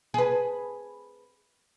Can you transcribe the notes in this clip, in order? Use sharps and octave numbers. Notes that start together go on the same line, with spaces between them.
G#4 B4